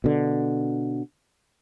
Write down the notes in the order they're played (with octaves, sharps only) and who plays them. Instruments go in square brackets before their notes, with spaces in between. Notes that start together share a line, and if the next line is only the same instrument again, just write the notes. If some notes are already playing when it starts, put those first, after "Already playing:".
[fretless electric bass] B2 D3